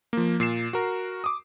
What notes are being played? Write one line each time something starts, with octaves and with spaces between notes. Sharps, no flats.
F3 A#3
A#2 C7 E7
F#4 A#4
D6 D#6